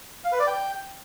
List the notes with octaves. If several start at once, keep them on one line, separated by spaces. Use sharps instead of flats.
F5
B4
D5
G5